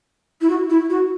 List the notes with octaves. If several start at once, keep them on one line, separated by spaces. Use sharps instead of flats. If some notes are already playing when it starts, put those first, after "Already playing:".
E4
F#4
E4
F#4